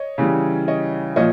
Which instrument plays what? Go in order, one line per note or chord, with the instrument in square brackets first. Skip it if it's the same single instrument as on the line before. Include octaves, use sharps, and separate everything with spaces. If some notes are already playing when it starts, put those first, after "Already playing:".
Already playing: [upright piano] C#5 D#5
[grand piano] C#3 E3 G3
[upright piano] C#5 D#5
[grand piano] A#2 F3 [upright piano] C#5 D#5